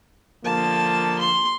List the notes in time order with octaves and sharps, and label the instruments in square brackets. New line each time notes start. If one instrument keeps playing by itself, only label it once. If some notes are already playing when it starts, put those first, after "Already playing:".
[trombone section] D3 F3 A#3 [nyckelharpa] A5
[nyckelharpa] C6